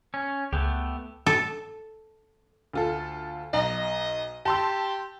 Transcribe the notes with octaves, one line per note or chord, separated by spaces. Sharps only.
C#4
C#2 A3 B3 G4
A4
D2 F4 A4
B1 D#5 A#5
G4 A5 C6 E6